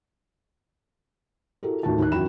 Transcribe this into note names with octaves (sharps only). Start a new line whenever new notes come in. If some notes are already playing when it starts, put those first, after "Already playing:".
E4 F#4 G4 A4 A#4
A1 D#2 A3 F4 F#4 A5
D#2 F#6
F#2 E3 F#4 G5 B5 E7